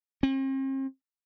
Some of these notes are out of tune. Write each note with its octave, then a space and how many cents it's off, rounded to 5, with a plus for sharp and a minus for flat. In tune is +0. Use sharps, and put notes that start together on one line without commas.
C4 +45